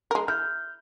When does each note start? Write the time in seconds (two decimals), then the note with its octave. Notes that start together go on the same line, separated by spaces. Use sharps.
0.11 G#3 A#4
0.28 E4 F6 G6